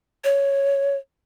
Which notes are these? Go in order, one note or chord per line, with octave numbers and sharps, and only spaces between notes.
C#5